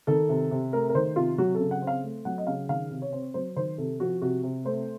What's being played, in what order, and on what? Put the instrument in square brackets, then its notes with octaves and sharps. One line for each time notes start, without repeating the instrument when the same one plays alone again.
[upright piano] D#3 A4
C3
C3
A3 A#4
A#4
D#3 C5
C3 F4
F#3 F#4
A4
C#3
F#5
C4
F5
A3
F#3 F#5
D#5
C#3 F5
D#3 F5
C3
C#5
C4
F#3 C5
D#3 C5
C3 A4
F3 F#4
C3 F#4
C3
A3 C5